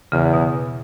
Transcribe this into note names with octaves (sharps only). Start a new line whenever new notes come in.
E2 C#3
B2